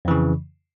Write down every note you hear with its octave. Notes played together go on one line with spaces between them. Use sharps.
F2 C#3 E3